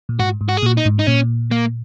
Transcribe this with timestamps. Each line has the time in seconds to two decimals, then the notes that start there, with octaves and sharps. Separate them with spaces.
0.09 A#2
0.19 G#2 F#4
0.41 G#2
0.49 F#4
0.57 G#4
0.62 A#2 F#4
0.77 D#4
0.85 G#2
0.99 D#4
1.07 A#2 C#4
1.51 A#3